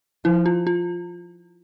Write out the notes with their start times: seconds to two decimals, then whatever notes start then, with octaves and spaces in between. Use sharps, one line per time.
0.25 F3 E4
0.46 F4
0.67 F4